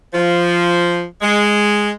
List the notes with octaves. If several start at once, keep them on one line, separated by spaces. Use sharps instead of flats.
F3
G#3